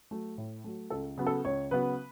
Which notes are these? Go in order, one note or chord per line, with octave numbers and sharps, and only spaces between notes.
F#3 A3
A2
F#3 A3
C#2 A4
C#3 F#3 B3
A4
C#2 C#5
C#3 F#3 B3 B4